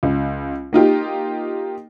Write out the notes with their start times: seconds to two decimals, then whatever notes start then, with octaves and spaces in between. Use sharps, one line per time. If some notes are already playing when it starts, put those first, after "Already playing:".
0.03 C#2
0.73 A#3 D#4 F4 G4